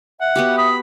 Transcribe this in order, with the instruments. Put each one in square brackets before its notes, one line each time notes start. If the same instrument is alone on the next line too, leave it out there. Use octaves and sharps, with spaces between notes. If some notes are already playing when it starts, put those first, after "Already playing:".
[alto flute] E5 [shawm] F#5
[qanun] B3 F#4 G4
[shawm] B5 [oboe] D#6